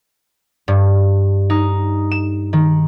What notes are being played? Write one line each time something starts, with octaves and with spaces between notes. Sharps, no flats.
G2
D#4
E7
D#3